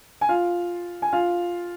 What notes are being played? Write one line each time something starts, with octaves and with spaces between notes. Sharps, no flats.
G#5
F4 F5
G#5
F4 F5